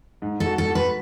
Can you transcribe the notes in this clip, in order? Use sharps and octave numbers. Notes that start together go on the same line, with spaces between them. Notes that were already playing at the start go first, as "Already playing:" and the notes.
G#2
A4
F#4
A4
F#4
B4